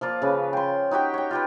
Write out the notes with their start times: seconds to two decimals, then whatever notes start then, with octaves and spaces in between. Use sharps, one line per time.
0.01 F3 A#3 F4 D5
0.22 C#3 B4
0.53 G5 C6
0.91 D#4 F#4 G4 G5
1.14 C#5 G5
1.31 F4 G4 B4